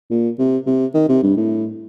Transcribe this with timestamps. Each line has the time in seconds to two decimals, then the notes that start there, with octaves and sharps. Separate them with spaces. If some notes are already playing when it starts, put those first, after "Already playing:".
0.10 A#2
0.39 C3
0.66 C3
0.94 D#3
1.09 C3
1.23 G2
1.37 A2